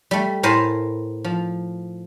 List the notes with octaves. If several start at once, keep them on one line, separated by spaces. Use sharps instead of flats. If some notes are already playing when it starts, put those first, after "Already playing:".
G3 A3
A2 A#4 C5 G#5 A5 B5
F3